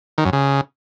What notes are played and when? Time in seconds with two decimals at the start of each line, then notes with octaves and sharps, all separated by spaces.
0.18 D#3
0.25 F#2
0.33 C#3